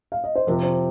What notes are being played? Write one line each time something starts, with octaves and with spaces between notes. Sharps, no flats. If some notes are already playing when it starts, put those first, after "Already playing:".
F5
D#5
C5
F2 C3 F3 A#4
C5